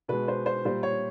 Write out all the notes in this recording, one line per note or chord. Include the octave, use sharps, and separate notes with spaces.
B2 G#3 B4
C5
C5
A#2 G3 C5
C#5